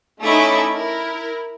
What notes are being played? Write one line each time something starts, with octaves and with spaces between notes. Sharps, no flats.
A3 C#4 D#4 E4 E5 D6
E4 A#4